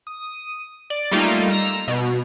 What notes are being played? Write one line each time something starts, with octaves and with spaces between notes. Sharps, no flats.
D#6
D5
G3 A3 A#3 D#4 F4
A#5 E6
B2